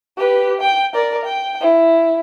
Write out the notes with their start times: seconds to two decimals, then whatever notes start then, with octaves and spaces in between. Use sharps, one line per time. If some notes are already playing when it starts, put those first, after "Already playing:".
0.17 G4 B4
0.61 G5
0.94 A#4 D5
1.25 G5
1.61 E4